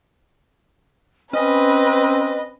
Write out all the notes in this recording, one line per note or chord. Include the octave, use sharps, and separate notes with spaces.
C4 C#4 B4 D#5